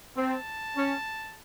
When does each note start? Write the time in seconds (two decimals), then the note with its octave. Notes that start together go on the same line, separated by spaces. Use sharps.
0.17 C4 A5
0.76 C#4